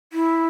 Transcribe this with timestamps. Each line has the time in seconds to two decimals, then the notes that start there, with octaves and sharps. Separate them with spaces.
0.13 E4